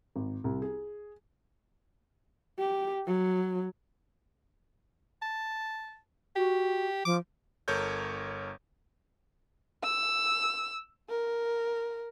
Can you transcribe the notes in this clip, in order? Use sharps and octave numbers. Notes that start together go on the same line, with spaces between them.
G#1
C2
G#4
G4
F#3
A5
F#4 G4
F3 D6
G1 A4 A#4 C#5 G6
E6
A#4